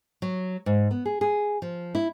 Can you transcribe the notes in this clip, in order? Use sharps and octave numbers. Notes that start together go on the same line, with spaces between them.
F#3
G#2
B3
G#4
G#4
F3
E4